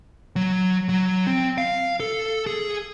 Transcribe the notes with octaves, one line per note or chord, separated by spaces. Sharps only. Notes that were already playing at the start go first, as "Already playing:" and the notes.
F#3
F#3
C4
F5
A4
G#4